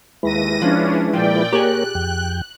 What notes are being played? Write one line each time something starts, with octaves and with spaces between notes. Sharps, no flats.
D#2 G#3 E4 B4 A#6 D#7
F3 C#4 D4
A#2 F3 D5 G5
A#3 G4 G#4 A#4 C#5 F#6
F2 G5